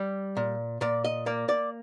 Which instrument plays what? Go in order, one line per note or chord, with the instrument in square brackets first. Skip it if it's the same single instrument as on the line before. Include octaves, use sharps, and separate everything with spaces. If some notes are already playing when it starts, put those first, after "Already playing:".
Already playing: [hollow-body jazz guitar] G3
A#2
A#2 D5
D#5
A#3 D5
D5